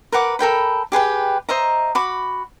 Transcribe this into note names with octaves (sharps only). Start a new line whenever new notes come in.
A#4 B4 F#5 D6
A4 A#4 G5 B5
G4 G#4 B4 G5
C5 D#5 E5 A#5
F#4 B5 D6